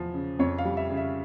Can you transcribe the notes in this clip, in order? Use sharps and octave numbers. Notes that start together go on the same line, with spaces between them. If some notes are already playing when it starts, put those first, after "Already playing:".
Already playing: E2 F3
C#3
F2 C#5
F5
G3
E5
C#3
E5